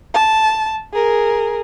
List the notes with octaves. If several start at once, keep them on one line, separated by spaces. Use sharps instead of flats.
A5
G#4 A#4